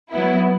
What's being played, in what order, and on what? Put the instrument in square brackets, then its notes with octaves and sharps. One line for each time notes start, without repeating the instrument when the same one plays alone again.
[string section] F#3 B3 E4